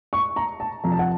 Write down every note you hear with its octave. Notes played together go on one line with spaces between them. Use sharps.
C#6
A#5
A5
F2 C3 F3 A#5
A5
F#5